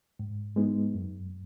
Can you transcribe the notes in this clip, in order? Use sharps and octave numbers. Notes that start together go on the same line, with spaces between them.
G#2
G#3 B3 D#4
F#2